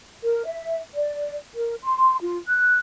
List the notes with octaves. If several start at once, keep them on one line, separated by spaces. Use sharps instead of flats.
A#4
E5
D5
A#4
C6
F4
F#6